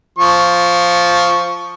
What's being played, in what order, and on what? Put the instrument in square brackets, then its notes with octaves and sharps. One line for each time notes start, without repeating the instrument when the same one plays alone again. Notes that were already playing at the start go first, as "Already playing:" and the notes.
[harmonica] F3 C#6